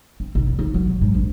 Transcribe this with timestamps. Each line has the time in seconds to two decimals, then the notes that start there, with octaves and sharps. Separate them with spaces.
0.20 C4
0.35 B1
0.47 E1
0.59 D#2
0.74 F#3
0.86 B2
1.01 G#2
1.14 A#1